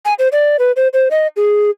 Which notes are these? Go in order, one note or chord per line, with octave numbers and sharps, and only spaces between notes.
G#5
C5
D5
B4
C5
C5
D#5
G#4